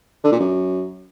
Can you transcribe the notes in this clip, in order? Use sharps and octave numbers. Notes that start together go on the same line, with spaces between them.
D3
A#2
F#2